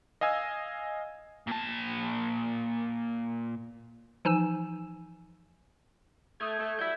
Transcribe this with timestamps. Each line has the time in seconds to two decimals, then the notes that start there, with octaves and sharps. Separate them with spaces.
0.21 D#5 F5 G#5 E6 G#6
1.47 A#2 A5
4.25 E3 F3 D#4 G#5 E6 E7
6.40 A3 D#6 G6 G#6
6.59 A3
6.79 F#3 G3 E4 G6 G#6